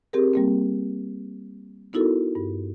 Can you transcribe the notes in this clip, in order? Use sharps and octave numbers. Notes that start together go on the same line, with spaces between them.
C4 G4 G#4 A#4
G3 A#3 C4
B3 D#4 E4 F#4 A4 A#4
G2